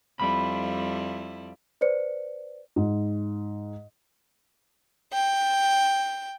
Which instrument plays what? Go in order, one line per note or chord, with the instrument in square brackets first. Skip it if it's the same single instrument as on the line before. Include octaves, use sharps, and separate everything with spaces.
[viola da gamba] F2 G3 E4 [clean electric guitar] B5
[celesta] B4 C5 D5 C#7
[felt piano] G#2
[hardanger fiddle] G5